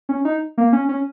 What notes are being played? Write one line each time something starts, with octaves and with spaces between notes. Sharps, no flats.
C#4
D#4
A#3
C#4
C#4